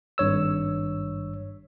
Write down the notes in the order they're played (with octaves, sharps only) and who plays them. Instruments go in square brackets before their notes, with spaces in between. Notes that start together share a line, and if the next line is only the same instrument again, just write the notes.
[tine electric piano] G#1 G2 C#5 E6